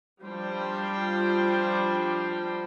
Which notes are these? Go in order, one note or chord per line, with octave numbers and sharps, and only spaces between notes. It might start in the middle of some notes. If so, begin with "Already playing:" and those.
F3 G3 D4 C5 F5 G5